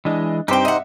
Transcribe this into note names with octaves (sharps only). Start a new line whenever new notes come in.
E3 G#3 D4 D#5
G2 C4 D#4 G4 C5 G5
D#5 E5 F#5